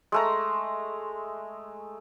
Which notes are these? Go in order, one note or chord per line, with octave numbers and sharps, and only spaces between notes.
G#3 A3 A#5